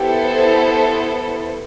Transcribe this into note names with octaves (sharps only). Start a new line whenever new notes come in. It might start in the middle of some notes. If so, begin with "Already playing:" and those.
Already playing: B3 E4 G4 A4 C5